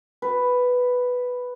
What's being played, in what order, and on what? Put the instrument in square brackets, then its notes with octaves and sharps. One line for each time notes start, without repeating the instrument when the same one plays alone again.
[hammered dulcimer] B4